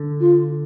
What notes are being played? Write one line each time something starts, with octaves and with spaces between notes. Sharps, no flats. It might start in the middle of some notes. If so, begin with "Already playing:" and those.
Already playing: D3
F4